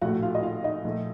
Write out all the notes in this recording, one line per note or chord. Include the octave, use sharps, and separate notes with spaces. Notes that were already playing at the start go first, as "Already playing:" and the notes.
A#1 A2 A3 F#4 F#5
F4 F5
D#5
F4 F5
D#4 D#5
A#1 A#2 A3